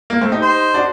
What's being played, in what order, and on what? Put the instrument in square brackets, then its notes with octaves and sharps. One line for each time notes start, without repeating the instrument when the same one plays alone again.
[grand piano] A#3
A3 C4
D#4 G4
[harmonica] C5
[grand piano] D4 F#4